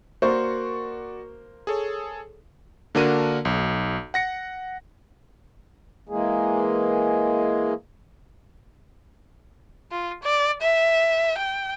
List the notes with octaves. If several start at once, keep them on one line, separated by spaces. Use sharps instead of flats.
A#3 F#4 A#4 C5 D5 C#6
G#4 A4 C#5
D3 A#3 D4 F#4 A#4 D#7
B1
F#5 A#6 C#7
E3 G#3 A#3 G#4
F4
D5
E5
G5